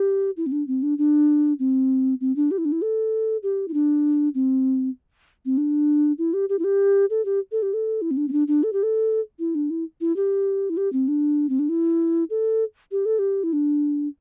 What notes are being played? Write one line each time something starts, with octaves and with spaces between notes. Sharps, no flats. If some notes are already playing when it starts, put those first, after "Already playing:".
Already playing: G4
E4
C4
D4
C4
D4
D4
C4
C4
D4
G4
E4
D4
E4
A4
G4
E4
D4
C4
C4
D4
E4
G4
G4
E4
G4
A4
G4
A4
G4
A4
E4
C4
D4
C4
D4
D4
A4
G4
A4
E4
D4
E4
E4
G4
E4
G4
C4
D4
C4
D4
E4
A4
G4
A4
G4
E4
D4